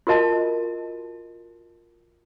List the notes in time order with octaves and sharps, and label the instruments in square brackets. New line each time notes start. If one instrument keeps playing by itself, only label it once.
[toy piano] F4 F#4 A#4 D#5 A5